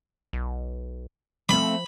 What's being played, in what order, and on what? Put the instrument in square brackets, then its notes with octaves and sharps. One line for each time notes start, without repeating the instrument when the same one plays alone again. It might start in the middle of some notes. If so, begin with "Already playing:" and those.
[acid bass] B1
[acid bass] F3 [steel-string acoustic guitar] A3 C4 [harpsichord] B5